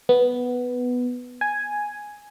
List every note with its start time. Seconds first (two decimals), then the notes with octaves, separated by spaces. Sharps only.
0.09 B3
1.41 G#5